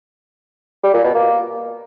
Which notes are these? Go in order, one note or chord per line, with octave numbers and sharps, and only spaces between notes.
G3
A#2
B2
A#3